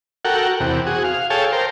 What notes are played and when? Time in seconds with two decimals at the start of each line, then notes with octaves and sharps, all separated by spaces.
0.25 F#4 A4 A#4 F#5 G5
0.60 E2 C3
0.86 F#4 G#4
1.04 F5
1.30 G#4 A4 C#5 F5 G5 A5
1.52 A#4 C5 G5